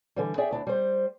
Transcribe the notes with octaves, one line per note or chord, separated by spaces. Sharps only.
D3 E3 G3
G#4 D5 E5 G5
D2 D4 E4
G3 C5